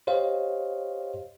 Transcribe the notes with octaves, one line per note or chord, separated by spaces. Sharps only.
G4 C5 C#5 D#5 F5